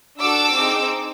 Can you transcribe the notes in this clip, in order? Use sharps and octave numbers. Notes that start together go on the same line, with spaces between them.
D4 F#4 A4 D6 E6
C4 D#4 G#4